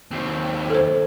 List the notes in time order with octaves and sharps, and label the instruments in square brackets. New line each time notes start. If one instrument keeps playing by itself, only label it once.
[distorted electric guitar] D#2 C4
[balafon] A4 C5